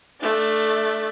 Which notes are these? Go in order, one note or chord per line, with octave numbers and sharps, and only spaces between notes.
A3 D4